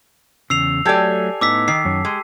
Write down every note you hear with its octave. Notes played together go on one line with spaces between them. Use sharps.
E2 C#3 E6 C7 F7
F#3 A3 G4 A4 D5 G#5
A2 B3 D#4 D6 E6 B6
D#3 C7
F#2 C#4
G#3 G4